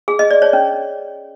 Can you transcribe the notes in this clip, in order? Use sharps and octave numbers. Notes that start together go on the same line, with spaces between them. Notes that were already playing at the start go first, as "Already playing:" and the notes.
G#4
D#5
D5
C#5
C#4